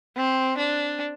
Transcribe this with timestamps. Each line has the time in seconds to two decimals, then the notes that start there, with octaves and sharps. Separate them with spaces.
0.17 C4
0.58 D4